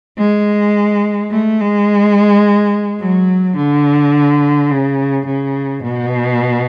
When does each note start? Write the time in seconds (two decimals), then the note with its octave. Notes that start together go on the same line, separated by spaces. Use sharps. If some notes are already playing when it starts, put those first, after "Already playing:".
0.18 G#3
1.31 A3
1.60 G#3
3.00 F#3
3.56 D3
4.70 C#3
5.26 C#3
5.83 B2